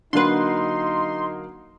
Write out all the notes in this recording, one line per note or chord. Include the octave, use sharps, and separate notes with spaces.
D3 F#3 A#3 D4 D#4 B4 C6